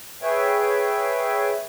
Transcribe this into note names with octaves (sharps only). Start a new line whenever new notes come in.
G#4 B4 C#5 E5 G5